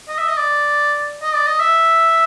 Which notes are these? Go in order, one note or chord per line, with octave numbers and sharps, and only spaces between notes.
D#5
E5
D#5
D5
D#5
D5
D#5
E5